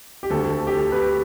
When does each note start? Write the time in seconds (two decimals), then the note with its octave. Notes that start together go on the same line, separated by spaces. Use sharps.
0.23 G4
0.30 D2 D3 A3 A4
0.44 A4
0.67 G4
0.72 A4
0.92 G4 B4